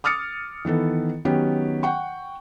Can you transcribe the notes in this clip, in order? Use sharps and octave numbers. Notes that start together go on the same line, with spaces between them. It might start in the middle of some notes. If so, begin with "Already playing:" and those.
D6 D#6 F6 A6 C#7
D#3 E3 B3 A4
D#3 F#3 B3 C#4 G4
F#5 G5 C#6